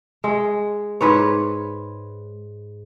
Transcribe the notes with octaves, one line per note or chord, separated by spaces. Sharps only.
G#3
G#2 B4 C#5